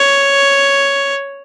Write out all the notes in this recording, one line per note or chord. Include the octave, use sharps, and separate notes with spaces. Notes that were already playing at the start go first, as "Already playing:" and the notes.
Already playing: C#5